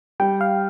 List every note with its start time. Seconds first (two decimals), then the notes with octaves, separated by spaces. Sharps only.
0.20 G3 G5
0.41 F5